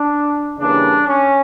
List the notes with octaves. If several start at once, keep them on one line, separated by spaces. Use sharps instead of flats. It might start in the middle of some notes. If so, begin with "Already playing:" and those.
Already playing: D4
C#3 E3 G3 A#3 D4
C#4